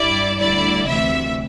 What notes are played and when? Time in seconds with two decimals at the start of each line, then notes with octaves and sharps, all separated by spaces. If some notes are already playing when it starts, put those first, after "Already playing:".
Already playing: G2 G3 E4 D5
0.39 D2 D3 G3 E4 D5
0.87 D2 C3 E3 E5